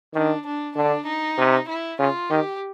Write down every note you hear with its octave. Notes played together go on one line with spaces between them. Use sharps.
D#3 D4
D4
D3 D4
D#4
C3
E4
C#3 F4
D#3 G4